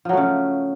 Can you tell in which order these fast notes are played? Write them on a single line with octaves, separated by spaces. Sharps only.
F3 F#3 A3 C#3